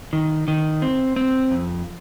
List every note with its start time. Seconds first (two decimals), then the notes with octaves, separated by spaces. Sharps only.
0.13 D#3
0.48 D#3
0.82 C4
1.16 C4
1.51 F2